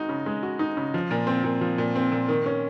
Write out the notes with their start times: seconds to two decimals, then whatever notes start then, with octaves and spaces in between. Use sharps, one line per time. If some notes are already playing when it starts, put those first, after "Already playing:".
Already playing: G#3 D#4 F#4
0.09 C#3
0.26 G#3
0.43 F#4
0.59 D#4
0.77 C#3
0.94 F3
1.11 A#2
1.27 C4
1.44 A#2
1.61 F3
1.78 A#2
1.95 C4
2.12 A#2
2.28 D#3
2.46 C#4